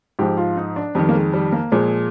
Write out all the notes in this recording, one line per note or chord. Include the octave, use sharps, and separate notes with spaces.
G#2 F3 G4
F4
D#4
D4
F2 D#3 G3
A#3
G#3
G3
A#3
A#2 F3 G#3